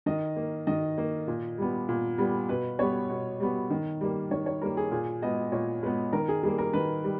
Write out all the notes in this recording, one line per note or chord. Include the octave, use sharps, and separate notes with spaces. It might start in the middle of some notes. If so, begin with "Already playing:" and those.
D#3 D#5
A#3
D#3 D#5
A#3
A#2
G3 B3
A#2
G3 B3
B2 B4
G3 B3 C#5
B2
G3 B3
D#3
G3 A#3
D#3 C#5
C#5
G3 A#3 A#4
G#4
A#2 G#4
G#3 B3 D#5
A#2 C#5
G#3 B3 B4
D#3 A#4
G#4
G3 A#3 G#4
A#4
D#3 B4
G3